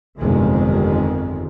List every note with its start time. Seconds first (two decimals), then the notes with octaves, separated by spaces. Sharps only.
0.19 G1 F2 C3 D#3 G#3